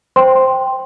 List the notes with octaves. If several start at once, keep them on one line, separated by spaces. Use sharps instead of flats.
C5 G5 C6